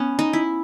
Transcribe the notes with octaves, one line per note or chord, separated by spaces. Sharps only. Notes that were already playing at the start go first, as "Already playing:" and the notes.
Already playing: B3 C#4
D#4
E4